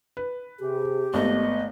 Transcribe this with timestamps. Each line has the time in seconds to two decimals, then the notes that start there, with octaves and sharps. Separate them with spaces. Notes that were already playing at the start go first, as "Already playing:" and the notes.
0.17 B4
0.60 C3 G4 G#4
1.14 G#1 A3 B3 D#5